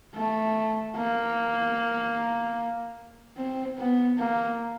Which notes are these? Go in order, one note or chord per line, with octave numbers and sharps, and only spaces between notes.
A3
A#3
C4
B3
A#3